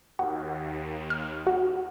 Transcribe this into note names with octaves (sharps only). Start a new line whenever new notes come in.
D#2 F#4
F6
F#4